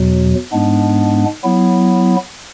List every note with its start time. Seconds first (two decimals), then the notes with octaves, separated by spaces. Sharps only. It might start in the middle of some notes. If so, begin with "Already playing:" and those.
Already playing: E2 B2 F#3
0.52 G#2 G#3 B3 D4
1.44 F#3 B3 E4